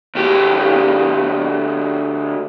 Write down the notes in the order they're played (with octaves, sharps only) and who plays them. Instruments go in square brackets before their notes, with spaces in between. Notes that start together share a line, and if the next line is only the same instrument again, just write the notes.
[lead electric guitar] D2 G4